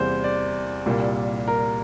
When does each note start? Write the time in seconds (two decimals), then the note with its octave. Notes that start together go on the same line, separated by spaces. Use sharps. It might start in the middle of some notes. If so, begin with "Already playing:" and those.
Already playing: E2 C3 G3 A#3 C5
0.24 D5
0.86 C2 A#2 G3 A#3
1.48 A#4